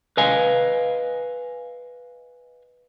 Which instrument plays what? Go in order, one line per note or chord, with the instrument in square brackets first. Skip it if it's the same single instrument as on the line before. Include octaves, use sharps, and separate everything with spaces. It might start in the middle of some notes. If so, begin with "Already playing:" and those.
[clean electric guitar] B4 D#5 F5 G#5